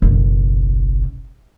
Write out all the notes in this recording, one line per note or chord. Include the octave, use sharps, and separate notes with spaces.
F#1 B1